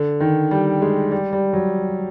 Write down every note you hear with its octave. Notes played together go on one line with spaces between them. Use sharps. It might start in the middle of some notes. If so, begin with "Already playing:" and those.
Already playing: D3
D#3
G3
G#3
G3
G3
F#3